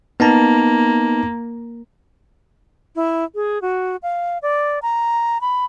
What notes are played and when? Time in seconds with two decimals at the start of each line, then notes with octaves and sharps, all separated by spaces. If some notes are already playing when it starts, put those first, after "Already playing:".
0.20 A#3 B3 D#4 A5
2.96 E4
3.35 G#4
3.62 F#4
4.03 F5
4.43 D5
4.82 A#5
5.41 B5